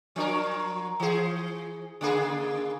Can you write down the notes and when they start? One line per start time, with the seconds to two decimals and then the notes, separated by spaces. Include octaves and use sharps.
0.16 F3 D4 A#4
1.00 E3 G#4
2.01 C#3 A#3 G#4